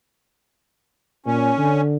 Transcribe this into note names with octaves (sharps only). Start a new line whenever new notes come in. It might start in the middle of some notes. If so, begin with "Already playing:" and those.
A#2 C#4
D3